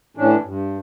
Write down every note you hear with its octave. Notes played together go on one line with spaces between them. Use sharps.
A2 E3 C#4 D4
G2